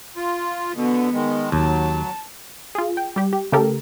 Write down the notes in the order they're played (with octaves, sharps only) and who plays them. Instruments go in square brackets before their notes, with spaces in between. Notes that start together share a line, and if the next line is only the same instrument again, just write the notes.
[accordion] F4
[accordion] B2 D3 [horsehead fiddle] B3
[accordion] D#3 G#3
[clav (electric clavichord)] D#2 [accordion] F#3 [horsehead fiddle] A5
[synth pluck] F4 G#4
G5
G3 G4
G4
C#3 A3 G4 A4 A#4